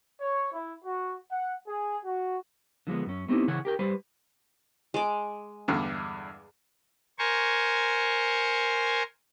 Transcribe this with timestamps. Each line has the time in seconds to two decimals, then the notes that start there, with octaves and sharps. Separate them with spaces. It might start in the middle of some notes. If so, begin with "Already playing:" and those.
0.20 C#5
0.52 E4
0.84 F#4
1.31 F#5
1.67 G#4
2.03 F#4
2.87 D3 F3 G#3 B3
3.06 F#2 C#4
3.28 A3 B3 C4 D#4 E4 G4
3.48 C#3 E3 C#5 F#5 G#5
3.65 G4 A#4 G5
3.79 G3 B4 C5
4.94 G#3 D6
5.68 E2 G2 D3
7.19 A#4 C5 G#5 C#6